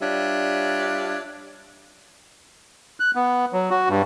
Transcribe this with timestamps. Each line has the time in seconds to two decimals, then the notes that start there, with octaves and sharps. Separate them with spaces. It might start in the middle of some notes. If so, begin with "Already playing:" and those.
0.01 G3 D4 F4 C#5 E5
3.00 F#6
3.15 B3
3.53 F#3
3.71 F#4
3.89 G2